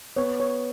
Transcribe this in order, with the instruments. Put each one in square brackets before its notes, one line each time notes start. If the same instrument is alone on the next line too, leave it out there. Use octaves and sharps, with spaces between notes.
[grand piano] B3 [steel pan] C#5
[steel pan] C#5